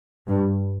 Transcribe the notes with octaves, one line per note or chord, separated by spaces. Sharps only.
G2